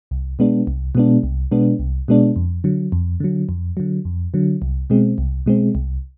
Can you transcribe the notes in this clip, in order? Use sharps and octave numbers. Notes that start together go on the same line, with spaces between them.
C2
B2 G#3 B3 D4
C2
B2 G#3 B3 D4
C2
B2 G#3 B3 D4
C2
B2 G#3 B3 D4
F2
D3 F#3
F2
D3 F#3
F2
D3 F#3
F2
D3 F#3
C2
B2 G#3 C4
C2
B2 G#3 C4
C2